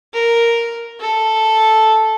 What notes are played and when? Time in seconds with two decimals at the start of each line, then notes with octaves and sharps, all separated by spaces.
0.13 A#4
1.00 A4